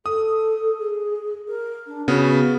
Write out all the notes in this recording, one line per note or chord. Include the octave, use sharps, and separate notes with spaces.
A4 D#6
G#4
A#4
D4
C#3 B3 F#4